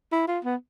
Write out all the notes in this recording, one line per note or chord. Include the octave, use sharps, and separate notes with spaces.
E4
F4
B3